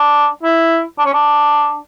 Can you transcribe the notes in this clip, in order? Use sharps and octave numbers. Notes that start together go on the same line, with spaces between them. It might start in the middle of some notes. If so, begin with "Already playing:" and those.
Already playing: D4
E4
D4
C#4
D4